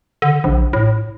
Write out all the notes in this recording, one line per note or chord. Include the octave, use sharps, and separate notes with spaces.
D3
A#1
A2